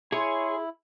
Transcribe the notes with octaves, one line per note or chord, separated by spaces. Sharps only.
E4 G#4 C#5 G#5 C6